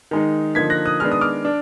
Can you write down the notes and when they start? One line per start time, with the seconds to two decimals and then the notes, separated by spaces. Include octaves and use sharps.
0.11 D#3 G#3 D#4
0.55 D3 F3 A#3 D#4 G#6 B6
0.70 F#6 A#6
0.85 D#6 F#6
1.00 D#3 G#3 B3 D4 F6
1.12 D#6
1.21 D6 F6
1.45 D4